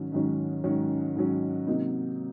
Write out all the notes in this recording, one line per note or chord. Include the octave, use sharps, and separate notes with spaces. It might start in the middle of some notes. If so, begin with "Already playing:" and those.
Already playing: G#2 D#3 F#3 C#4
G#2 D#3 F#3 C#4
G#2 D#3 F#3 C#4
G#2 D#3 F#3 C#4
C3 F#3 A#3 D#4